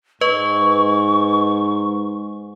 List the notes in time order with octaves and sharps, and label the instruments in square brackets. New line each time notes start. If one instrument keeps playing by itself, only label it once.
[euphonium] G#2 [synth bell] B4 D#5 [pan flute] C#6